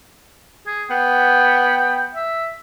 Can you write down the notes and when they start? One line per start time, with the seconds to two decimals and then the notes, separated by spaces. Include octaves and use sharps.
0.67 G#4
0.90 B3 G5
2.15 E5